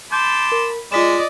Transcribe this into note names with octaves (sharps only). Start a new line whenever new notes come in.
A5 B5 C6 D6 G6
A#4
G#3 F4 D5 D#5 B6 E7